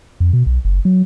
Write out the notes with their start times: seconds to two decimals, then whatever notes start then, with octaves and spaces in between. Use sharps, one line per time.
0.20 F2
0.33 B2
0.46 B1
0.65 F#1
0.85 F#3